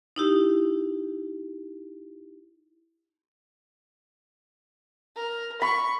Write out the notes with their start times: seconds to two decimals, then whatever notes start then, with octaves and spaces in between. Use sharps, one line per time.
0.16 D#4 E4 G4
5.16 A#4
5.62 B5 C#6